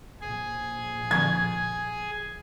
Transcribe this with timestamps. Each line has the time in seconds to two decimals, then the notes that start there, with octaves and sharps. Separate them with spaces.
0.21 A#1 G#4 G#5
1.11 D3 F3 C#6 G#6